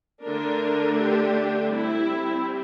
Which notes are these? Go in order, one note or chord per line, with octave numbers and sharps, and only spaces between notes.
D3 A3 D4 A#4
G4
G3 C4 E4